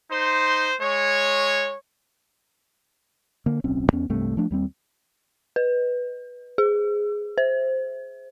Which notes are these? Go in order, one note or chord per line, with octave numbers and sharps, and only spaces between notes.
D#4 C5 C6
G#3 C#5
D3 A#3
D1 B1 C4 C#4
E2 B3 C#4
C2 G2 C3 A3
F3 A3 D4
D#2 G3 C4
B4
G#4
C5